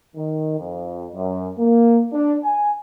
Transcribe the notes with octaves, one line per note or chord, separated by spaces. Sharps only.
D#3
F2
F#2
A#3
D4
G#5